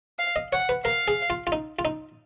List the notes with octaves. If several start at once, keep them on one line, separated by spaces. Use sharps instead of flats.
F5
D#5
C#5 F#5
B4
A#4 F5
G#4
F4
F4
D#4
F4
D#4